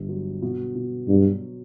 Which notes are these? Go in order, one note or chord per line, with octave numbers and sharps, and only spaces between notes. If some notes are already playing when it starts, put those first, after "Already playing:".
Already playing: G1 G3
F#3
B2
B2
G2 F#3